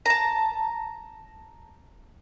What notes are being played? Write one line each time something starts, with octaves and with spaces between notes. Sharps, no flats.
A5 A#5